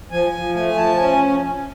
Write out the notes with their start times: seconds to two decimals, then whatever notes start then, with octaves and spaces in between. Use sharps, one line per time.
0.11 F3 G#5
0.32 F3
0.54 A3 G#5
0.76 F3 A5
0.97 C#4 G#5